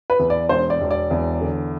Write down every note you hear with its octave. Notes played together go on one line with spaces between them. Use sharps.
B4
E2
D5
E1 C5
D5
E1
D5
E2
D3